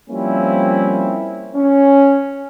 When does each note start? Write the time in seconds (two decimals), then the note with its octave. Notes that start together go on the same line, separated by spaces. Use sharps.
0.10 F3 G3 A#3 C4 C#4 E4
1.55 C#4